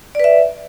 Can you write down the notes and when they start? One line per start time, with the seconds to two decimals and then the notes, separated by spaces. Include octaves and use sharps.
0.15 D5
0.20 B4
0.24 E5